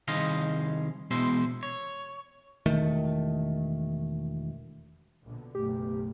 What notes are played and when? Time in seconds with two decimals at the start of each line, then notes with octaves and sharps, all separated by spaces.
0.08 C2 D#3 G#4 C5 D#5 F5
1.11 E2 B2 G#3 E4 C5
1.63 C#5
2.66 E1 D#3 A3
5.24 A#1 B2 D3
5.55 F#1 B1 A3 G4